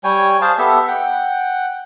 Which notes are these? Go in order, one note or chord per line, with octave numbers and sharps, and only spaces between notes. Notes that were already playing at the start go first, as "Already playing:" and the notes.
G3 C#5 G5 G#5
G#4 C5 F5 A5
B3 G4 A4 E5
F#5 G5